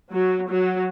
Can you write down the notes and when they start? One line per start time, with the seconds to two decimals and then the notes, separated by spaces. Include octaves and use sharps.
0.12 F#3
0.50 F#3